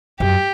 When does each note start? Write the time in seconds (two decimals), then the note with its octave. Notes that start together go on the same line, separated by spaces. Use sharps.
0.20 F#2 G4